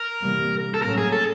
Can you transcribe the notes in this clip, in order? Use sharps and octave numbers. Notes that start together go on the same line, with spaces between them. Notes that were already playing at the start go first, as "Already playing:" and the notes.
Already playing: A#4
C3 E3 G3 A#3
A4
A2 F#3 A#3 C#4 A#4
G#4
A4